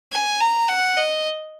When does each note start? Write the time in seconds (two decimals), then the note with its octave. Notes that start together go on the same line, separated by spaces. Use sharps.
0.12 G#5
0.40 A#5
0.68 F#5
0.97 D#5